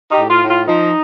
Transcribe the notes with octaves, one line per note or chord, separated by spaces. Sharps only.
D#4 G4
A2
F4
A2
F4
F3 D#4